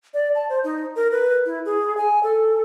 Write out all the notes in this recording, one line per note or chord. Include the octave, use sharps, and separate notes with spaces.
D5
A5
C5
D#4
A#4
B4
E4
G#4
G#5
A4